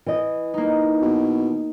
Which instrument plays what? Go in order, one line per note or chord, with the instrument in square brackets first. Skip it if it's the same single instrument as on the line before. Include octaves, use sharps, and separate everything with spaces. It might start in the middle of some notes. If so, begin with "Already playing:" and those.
[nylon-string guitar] E3 D#5
[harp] A#3 D#4
[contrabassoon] B2